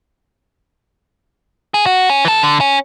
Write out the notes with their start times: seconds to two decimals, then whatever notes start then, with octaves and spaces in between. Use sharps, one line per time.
1.74 G#4
1.86 F#4
2.10 C#4
2.25 E3 A4
2.43 D3
2.61 C#4